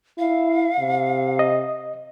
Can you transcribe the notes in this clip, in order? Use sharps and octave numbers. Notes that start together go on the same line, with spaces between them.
E4 F5
C3
D#5